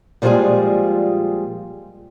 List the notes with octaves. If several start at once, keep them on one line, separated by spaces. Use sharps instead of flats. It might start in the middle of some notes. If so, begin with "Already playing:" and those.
A#2 F3 G3 G#3 F4 G#4